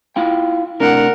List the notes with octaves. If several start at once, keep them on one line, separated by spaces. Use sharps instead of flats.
E4 F4 G5
A2 C3 D4 A#4 F#5